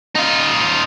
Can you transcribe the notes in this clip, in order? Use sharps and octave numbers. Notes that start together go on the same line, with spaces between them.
D#4 F4